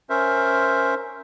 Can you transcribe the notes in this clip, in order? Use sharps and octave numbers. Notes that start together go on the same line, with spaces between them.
C#4 A#4 C5 E5